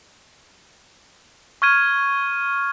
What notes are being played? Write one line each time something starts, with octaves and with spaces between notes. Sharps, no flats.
C#6 F6 G#6 D#7